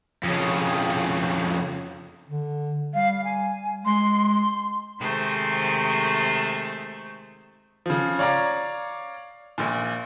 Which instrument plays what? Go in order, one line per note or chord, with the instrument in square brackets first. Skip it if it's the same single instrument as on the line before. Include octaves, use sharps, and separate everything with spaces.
[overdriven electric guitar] F2 C#3
[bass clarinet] D3
[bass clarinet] G3 [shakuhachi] F5
[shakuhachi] G#5
[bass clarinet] G#3 [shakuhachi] C6
[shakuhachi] C6
[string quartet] C3 D#3 G#3 A3 C5
[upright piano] C#3 F3
C#5 D5 F5 A#5 D6
A#1 A#2